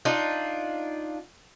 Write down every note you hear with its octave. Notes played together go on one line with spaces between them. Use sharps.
D4 D#4 F4